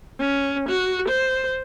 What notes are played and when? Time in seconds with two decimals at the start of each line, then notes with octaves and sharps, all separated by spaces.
0.20 C#4
0.69 F#4
1.08 C5